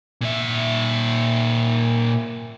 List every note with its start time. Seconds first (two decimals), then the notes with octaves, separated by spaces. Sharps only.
0.21 A#2 E5